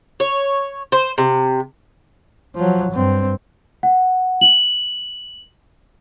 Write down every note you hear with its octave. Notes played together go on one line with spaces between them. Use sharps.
C#5
C5
C3
F3 F#3
G2 C4
F#5
F#7